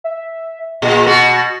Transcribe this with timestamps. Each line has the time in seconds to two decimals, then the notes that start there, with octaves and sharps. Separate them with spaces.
0.04 E5
0.82 A#2 G#4
1.07 B2 F#4 A#6